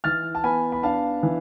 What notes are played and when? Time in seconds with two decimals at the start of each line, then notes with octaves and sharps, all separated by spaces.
0.04 E3 F6 A6
0.35 A5
0.44 B3 G#5 B5
0.72 B5
0.83 D4 F5 A5
1.23 E3